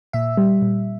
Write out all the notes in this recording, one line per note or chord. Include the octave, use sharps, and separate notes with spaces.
A#2 E5
G3
A#2